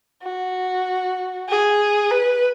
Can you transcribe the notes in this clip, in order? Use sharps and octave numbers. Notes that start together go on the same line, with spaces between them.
F#4
G#4
B4